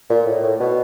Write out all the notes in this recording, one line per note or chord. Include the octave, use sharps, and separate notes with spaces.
A#2
A2
A2
B2